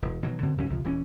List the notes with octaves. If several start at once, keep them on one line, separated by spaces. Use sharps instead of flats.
E1
B2 D#3 E3 F#3
F#2 D3 C4
D2 G#2 F#3 C#4
C#2 C3 F3
D#1 E3 C4 C#4